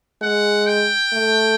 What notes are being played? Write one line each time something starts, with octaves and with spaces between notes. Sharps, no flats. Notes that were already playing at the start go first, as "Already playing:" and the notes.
G#3 F#5
G5
A3